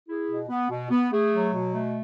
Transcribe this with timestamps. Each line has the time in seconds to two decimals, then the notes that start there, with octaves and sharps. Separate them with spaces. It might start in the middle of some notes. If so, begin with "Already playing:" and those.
0.08 E4 G#4
0.29 B2
0.49 B3
0.70 B2
0.90 B3
1.11 A3 G#4
1.32 F#3
1.52 B2
1.73 A3